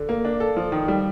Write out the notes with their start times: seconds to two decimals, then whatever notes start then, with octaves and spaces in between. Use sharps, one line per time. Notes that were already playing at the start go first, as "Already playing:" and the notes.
Already playing: D3
0.09 A#3
0.25 D4
0.40 A4
0.56 F3
0.72 D#3
0.88 G3